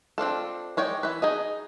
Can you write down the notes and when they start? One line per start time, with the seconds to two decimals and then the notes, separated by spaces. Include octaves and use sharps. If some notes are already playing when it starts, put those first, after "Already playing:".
0.18 C4 D4 F4 A4
0.77 G#3 C#5 D5 G5
1.03 E3 B4
1.22 D#4 G#4 D#5